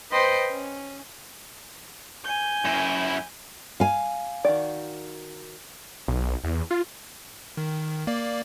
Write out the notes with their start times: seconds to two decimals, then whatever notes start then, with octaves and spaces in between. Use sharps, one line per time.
0.11 B4 C5 D#5 G5 C6
0.49 C#4
2.23 G#5 G6
2.65 F#2 E4
3.80 F5 G#5
4.45 D#3 F#4 D5
6.08 B1
6.44 E2
6.71 F4
7.57 D#3
8.07 A#3 D5